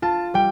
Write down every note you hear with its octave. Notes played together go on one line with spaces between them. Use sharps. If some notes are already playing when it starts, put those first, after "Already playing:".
F4 A5
G3 G5